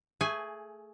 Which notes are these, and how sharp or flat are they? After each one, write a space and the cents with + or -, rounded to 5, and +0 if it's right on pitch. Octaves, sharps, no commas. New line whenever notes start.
A3 +10 G#4 +20 G#5 +0